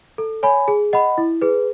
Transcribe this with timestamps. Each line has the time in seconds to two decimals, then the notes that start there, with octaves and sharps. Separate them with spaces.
0.18 A4
0.43 C#5 G#5 B5
0.68 G#4
0.93 D#5 F#5 B5
1.18 E4
1.41 G#4 B4